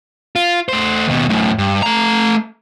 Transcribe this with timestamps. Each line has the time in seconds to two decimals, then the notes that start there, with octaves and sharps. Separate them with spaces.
0.36 F4
0.69 A3 C5
1.07 D#2 B2
1.29 F#2 A2
1.58 G2
1.82 A3 A#5